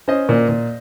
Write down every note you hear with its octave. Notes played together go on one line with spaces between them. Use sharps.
C#4 C5 D#5
A#2
A#2